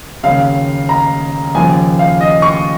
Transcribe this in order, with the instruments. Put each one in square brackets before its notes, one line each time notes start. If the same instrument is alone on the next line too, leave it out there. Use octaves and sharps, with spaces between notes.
[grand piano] D#2 C#3 F#3 F5
A#5
D#2 C#3 F3 G#5
F5
D#5
C#6